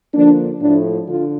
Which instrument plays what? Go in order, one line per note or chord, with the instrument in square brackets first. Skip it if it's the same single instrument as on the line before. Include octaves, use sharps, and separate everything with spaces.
[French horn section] D3 F3 A#3 D4
A2 F3 A3 D4
D3 F4